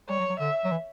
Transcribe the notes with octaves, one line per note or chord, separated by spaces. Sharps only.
G3 C#5
F#3
F#3
D3 E5
F#3
E3